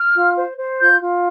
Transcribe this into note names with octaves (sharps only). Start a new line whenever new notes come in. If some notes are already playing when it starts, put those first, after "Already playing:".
Already playing: F6
F4
C5
C5
F4 G6
F4